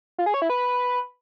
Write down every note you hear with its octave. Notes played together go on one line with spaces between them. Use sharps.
F4
G#4
C#5
E4
B4